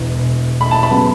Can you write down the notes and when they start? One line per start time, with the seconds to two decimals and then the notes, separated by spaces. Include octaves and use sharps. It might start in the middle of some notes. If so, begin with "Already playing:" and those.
Already playing: E1 E2
0.61 B5
0.71 A5
0.83 B5
0.91 C#3 F#3 B3